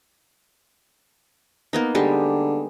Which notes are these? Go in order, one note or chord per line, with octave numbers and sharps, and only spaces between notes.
A#3 B3 D#4
D3 G3 G#3 G4